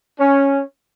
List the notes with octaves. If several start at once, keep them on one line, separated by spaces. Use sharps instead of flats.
C#4